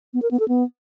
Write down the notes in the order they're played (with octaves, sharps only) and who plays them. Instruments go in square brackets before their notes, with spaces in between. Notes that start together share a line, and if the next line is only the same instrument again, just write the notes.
[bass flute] B3
A#4
B3
A4
B3